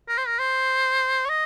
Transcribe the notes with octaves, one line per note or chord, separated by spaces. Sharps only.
A#4
C5
A#4
C5
C#5
D#5